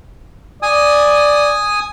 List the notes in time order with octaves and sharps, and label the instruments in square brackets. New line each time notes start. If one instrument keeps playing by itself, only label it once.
[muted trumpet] D5 [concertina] G#5 D#6